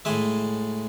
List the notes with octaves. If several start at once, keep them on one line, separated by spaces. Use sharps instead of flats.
A2 G#3 E5 G#5